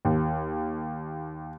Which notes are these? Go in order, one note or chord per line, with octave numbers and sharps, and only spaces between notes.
D#2